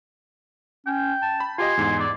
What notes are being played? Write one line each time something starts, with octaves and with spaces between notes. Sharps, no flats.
C#4 G5
A5
B5
F4 G4 D#5 G#5 C6
E2 G#2
D5